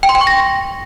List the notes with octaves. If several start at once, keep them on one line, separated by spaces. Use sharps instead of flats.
G5
C6
G5
C#6
A#6